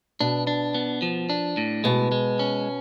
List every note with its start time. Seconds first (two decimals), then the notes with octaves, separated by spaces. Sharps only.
0.20 B2 D4
0.47 D4
0.75 B3
1.02 F3
1.30 D4
1.57 A2
1.84 B2 G#3
2.12 G#3
2.39 C#4